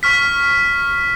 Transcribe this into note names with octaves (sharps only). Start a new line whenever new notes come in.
C#6 F6 B6